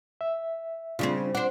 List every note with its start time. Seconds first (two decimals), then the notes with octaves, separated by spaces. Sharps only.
0.21 E5
0.99 C#3 G3 C4 D4 F4
1.35 D4 C5 F#5